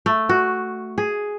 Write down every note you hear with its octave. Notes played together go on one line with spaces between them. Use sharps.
A3
F#4
G#4